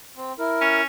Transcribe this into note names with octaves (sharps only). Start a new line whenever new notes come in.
C4
E4 A#4
C#4